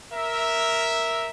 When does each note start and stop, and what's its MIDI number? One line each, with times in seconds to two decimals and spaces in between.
0.12 1.30 70
0.12 1.30 76